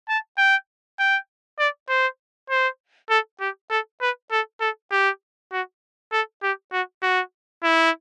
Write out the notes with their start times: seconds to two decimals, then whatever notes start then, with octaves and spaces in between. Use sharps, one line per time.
0.09 A5
0.38 G5
0.99 G5
1.59 D5
1.89 C5
2.50 C5
3.10 A4
3.40 G4
3.70 A4
4.01 B4
4.32 A4
4.61 A4
4.92 G4
5.52 F#4
6.12 A4
6.43 G4
6.72 F#4
7.03 F#4
7.63 E4